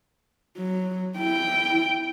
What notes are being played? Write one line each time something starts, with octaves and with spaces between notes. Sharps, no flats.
F#3
E4 G5